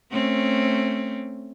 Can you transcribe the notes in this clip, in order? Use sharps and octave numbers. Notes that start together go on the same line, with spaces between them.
A3 C4 C#4